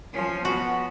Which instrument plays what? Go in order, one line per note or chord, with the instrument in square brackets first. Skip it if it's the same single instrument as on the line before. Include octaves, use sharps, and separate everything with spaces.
[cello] F3 C#4
[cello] B3 [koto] F#4